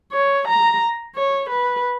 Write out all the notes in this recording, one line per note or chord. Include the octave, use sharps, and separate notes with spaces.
C#5
A#5
C#5
B4